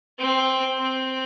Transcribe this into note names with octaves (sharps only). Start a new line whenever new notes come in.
C4
C4